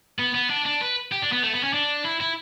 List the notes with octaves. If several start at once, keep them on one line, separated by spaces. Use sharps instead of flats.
B3
B3
D4
D4
B4
G4
D4
B3
A3
B3
C#4
D4
E4
E4